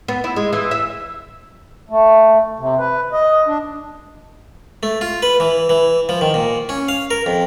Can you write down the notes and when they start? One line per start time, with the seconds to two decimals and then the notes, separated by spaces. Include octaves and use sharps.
0.08 B3
0.24 E4
0.36 G#3
0.53 E3
0.71 E5
1.90 A3
2.59 C3
2.79 B4
3.12 D#5
3.47 D4
4.83 A3
5.01 F4
5.22 B4
5.40 E3
5.69 E3
6.09 F3
6.21 D#3
6.34 A#2
6.69 C#4
6.88 F5
7.11 A#4
7.26 F2